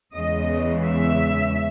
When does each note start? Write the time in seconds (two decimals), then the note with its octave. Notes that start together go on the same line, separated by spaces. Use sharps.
0.14 E2 C#3 G#3 D#5
0.85 E5